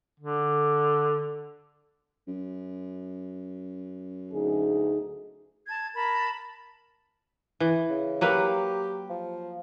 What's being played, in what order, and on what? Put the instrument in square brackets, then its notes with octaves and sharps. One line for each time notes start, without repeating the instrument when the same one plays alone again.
[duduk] D3
[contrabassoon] F#2
[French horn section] D2 D#4 G#4
[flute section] A5 G#6
A#4 A5 B5
[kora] E3
[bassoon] C#3
[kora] F#3 A#3 B4 [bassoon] G4
[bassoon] F3